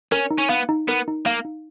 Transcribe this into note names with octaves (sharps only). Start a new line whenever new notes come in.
C#4 A#4
D#4
C#4
B3 F5
D#4
B3 A#4
D#4
A#3 F5
D#4